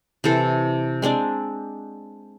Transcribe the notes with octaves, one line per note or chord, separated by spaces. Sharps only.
C3 E3 A4 C5
G#3 C4 D4 D5